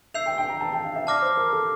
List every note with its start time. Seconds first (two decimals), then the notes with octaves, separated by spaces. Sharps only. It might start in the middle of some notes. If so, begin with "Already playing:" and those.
0.14 E5 E6 G6 C7 F7
0.26 G5
0.38 G5
0.49 A#5
0.60 A5
0.73 G5
0.84 F5
0.96 E5
1.07 D5 A5 D6 F6 A#6
1.22 C5
1.37 A#4
1.53 A4